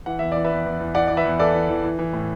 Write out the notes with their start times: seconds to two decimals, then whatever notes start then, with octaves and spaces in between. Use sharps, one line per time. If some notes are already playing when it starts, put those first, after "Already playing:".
0.06 E3 F#5
0.19 E2 E5
0.32 E3 D5
0.44 B4 E5
0.51 E2
0.66 E2
0.80 E2
0.95 E3 D5 F#5
1.08 E3 D5
1.17 B4 E5
1.25 E2
1.39 E3 A4 D5
1.54 E3
1.69 E3
1.84 E3
1.99 E3
2.13 A2